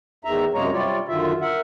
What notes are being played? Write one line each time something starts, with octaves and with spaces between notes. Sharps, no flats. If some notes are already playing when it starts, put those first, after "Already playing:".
E2 D#3 E5 A#5
F#2 C3 G#3 A#3 C#5 A#5
C3 G3 F4 C#5 D5
F#2 D3 D#3 F4 E5
A#4 E5 F#5